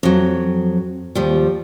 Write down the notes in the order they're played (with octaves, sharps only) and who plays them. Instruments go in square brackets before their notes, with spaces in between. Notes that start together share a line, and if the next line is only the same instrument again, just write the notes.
[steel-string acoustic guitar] F2 F#3
D#2 F3 G3